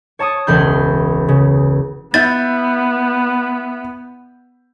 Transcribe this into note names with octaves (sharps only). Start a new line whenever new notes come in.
C#5 A5 C#6 D#6
E1 C#2 B5 C6 G6
C#3
B3 E4 E5 G6 A6